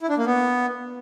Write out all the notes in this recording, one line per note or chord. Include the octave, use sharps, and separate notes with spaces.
E4
D4
A#3
B3